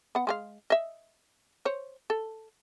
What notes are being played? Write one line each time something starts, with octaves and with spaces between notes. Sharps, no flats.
B3 F#5
G#3 G#4 F5
D#5 E5
C5 C#5
A4